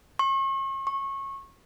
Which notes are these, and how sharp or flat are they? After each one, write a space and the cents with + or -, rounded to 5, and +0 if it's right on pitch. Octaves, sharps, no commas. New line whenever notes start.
C#6 -40
C#6 -25